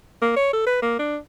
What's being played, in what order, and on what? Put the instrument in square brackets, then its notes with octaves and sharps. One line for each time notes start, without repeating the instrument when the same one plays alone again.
[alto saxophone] A#3
C#5
A4
B4
A#3
D4